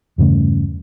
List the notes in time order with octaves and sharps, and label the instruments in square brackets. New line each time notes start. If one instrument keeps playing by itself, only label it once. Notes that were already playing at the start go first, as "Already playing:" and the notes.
[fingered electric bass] E2 G2 C#3 A3